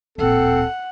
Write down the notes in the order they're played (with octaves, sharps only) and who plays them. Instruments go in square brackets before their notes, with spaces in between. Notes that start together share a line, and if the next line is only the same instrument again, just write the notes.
[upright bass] D1 A#1 [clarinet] C4 [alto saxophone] A4 [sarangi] F#5